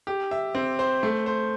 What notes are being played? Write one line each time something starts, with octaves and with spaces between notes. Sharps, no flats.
G4
E5
C4
C5
A3
C5